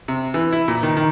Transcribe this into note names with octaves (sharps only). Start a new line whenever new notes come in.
C3
E3
E4
A#2
D#3
D#3